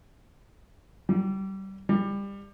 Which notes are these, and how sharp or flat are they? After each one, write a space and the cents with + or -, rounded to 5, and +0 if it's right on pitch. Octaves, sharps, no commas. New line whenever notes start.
G3 -25
G3 +25